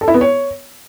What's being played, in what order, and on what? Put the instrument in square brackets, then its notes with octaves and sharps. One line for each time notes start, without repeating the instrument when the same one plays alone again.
[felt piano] A4
E4
B3
C#5